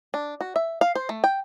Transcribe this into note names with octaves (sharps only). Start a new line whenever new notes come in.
D4
F#4
E5
F5
C5
A3
G5